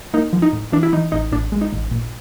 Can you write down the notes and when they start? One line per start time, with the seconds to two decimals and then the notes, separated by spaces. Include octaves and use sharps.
0.14 A#3 D#4
0.33 F3
0.42 D#4
0.53 A2
0.72 E3 D4
0.83 E4
0.93 E3 D#4
1.12 A1 D#4
1.32 A1 D4
1.52 G#3
1.61 D#4
1.73 A1
1.91 A#2